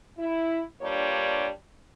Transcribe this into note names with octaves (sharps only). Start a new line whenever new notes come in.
E4
G2 G3 A#3 D4 F4 C#5